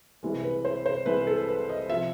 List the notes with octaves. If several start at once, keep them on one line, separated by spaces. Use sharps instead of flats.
C2 C3 E3 G#3
B4
C5
C5
C2 C3 E3 G#3 B4
A4
B4
D#5
C3 F3 E5